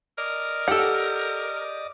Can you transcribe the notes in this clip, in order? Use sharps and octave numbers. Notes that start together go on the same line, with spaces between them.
A#4 D5 D#5
G4 A4 F#5